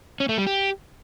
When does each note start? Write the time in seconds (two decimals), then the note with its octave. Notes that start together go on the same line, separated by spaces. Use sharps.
0.20 C#4
0.29 A3
0.38 G3
0.47 G4